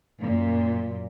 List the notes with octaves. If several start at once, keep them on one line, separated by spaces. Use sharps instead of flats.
F#2 A#2